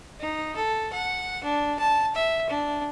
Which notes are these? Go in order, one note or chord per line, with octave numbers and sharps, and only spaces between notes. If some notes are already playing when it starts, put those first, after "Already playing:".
D#4
A4
F#5
D4
A5
E5
D4